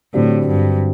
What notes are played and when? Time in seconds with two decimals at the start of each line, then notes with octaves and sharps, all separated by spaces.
0.14 A2 D3 F#3 C4 G4 D5
0.48 G2